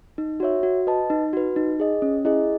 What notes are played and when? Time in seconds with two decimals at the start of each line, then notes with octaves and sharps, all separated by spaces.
0.18 D#4
0.40 F#4 C#5 E5
0.63 F#4
0.87 B4 D#5 A5
1.10 D#4
1.33 F#4 B4
1.56 D#4
1.80 G#4 D#5
2.02 C#4
2.25 E4 G#4 D#5